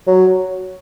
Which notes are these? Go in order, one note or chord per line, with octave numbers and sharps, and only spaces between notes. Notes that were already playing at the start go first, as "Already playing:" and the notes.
F#3